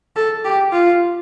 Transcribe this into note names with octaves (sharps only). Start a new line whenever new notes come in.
A4
G4
F4